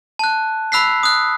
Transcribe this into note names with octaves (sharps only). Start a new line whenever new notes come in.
A5 F#6
B5 E6 F#6 B6 C7
D#6 F#6